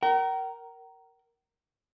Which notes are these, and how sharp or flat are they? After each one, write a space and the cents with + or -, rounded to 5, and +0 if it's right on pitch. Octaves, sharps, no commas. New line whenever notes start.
A#4 +0 G5 -45